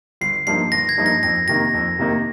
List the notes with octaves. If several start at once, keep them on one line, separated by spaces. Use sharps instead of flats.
G1 C7
G2 F3 A#3 D#4 C7
G1 A#6
G#6
G2 F3 A#3 D#4
A#6
F2 A#6
C3 D#3 A#3 D#4 A#6
F2
C3 D#3 A#3 D#4